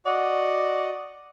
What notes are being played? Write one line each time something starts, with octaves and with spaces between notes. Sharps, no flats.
F#4 D5 D#5 F#5